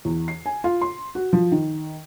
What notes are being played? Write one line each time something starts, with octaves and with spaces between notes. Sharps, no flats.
E2
C7
G#5
F4
C6
F#4
F3
D#3